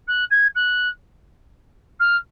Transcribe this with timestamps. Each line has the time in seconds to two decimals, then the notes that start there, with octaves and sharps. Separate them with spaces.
0.07 F#6
0.30 G#6
0.55 F#6
2.00 F6